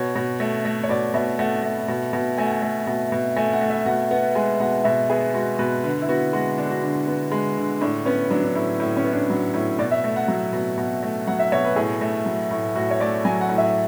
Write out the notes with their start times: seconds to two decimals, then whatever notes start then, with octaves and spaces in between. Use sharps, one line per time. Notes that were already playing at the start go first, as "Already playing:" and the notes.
Already playing: B2 C#5
0.15 B2
0.40 A3
0.65 A3
0.84 C#5
0.89 B2 D5
1.14 B2 E5
1.39 A3 F#5
1.63 A3
1.88 B2
2.13 B2
2.38 A3 G#5
2.45 F#5
2.52 G#5
2.62 A3
2.87 B2
3.12 B2
3.36 A3 G#5
3.53 F#5
3.61 A3
3.70 E5
3.86 B2 F#5
4.11 B3 F#5
4.35 G#3 G#5
4.60 B2 F#5
4.84 B2 E5
5.10 B3 G#4
5.34 G#3 F#4
5.59 B2 B4
5.83 D3 B4
6.02 E4
6.09 B3 F#4
6.33 G#3 F#4
6.58 D3 D4
6.70 F#4
6.82 D3
7.07 B3
7.32 G#3
7.57 D3
7.81 A2 D4
8.05 B3 C#4
8.31 F#3 D4
8.44 D4
8.55 A2 E4
8.80 A2 E4
8.97 C#4
9.05 B3 E4
9.13 D4
9.29 F#3 D4
9.54 A2 E4
9.79 B2 D5
9.91 E5
10.04 A3
10.16 F#5
10.28 F#3
10.53 B2
10.78 B2
11.03 A3
11.27 F#3 F#5
11.39 E5
11.52 B2 C#5
11.65 B4
11.76 A2 G#4
12.01 A3
12.26 F#3
12.51 A2
12.75 A2 F#4
12.91 C#5
13.00 A3 D5
13.25 F#3 G#5
13.41 F#5
13.49 A2
13.58 E5